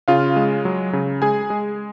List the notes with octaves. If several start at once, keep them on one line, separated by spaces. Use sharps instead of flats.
C#3 F4 F5
G#3
F#3
C#3
G#3 G#4 G#5
G#3